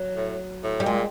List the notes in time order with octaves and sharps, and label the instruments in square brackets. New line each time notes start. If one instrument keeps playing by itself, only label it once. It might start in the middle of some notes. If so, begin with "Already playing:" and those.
Already playing: [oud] F#3
[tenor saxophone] A2
A2
[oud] G3
[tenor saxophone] A#2 [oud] G#3